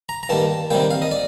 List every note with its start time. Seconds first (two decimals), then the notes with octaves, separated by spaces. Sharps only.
0.09 A#5
0.23 A#5
0.29 G2 D#3 A#3 A5
0.70 C3 D#3 G3 A#3 G5
0.91 F5
1.02 D#5
1.11 D5